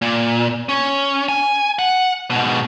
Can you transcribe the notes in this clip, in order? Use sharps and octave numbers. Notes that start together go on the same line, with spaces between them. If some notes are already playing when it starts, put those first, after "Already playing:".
A#2
C#4
G#5
F#5
G#2 B2